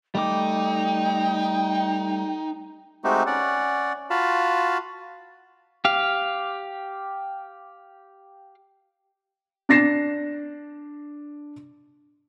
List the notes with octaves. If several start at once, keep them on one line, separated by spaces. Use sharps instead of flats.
G3 A3 D#4 G5 D6
G#3 A3 C4 D#4 F#4 G4
C#4 D5 F#5
F4 F#4 F5 A5 B5
G4 F5
D4 A6 A#6 C7 E7